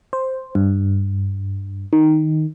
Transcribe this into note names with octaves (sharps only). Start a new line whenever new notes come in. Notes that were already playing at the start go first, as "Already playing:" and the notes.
C5
G2
D#3